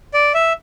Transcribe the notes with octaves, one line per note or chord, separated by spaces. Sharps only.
D5
E5